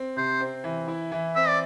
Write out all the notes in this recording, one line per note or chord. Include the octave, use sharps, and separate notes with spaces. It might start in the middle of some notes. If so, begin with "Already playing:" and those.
Already playing: C4
C3 C5
C4
E3
E4
E3
C4 E5
D5